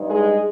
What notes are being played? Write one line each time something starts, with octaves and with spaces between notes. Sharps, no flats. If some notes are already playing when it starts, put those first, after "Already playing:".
Already playing: G2 G3 D#4
G#3 G#4